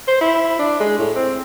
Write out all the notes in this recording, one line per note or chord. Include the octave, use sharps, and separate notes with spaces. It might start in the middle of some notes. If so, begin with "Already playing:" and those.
C5
E4
D4
G#3
A2
C4